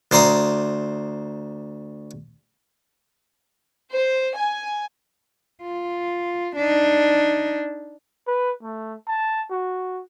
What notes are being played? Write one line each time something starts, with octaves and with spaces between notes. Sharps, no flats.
D2 C5 D5 A#5 C6 D#6
C5
G#5
F4
D4 D#4
B4
A3
A5
F#4